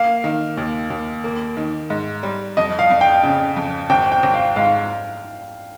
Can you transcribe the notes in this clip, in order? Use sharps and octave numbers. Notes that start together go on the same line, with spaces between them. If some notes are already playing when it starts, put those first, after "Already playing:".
Already playing: A#3 F5
D#3
D#2
D#2
A#3
D#3
G#2
G3
F2 D#5
F5
F2
G5
C#3
F2
G#1 G5
G5
G#1
F5
G#2 F5